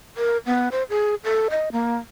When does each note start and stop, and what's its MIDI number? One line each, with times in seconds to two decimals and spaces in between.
0.17 0.37 70
0.46 0.69 59
0.72 0.83 72
0.90 1.15 68
1.24 1.48 69
1.50 1.69 75
1.72 1.96 58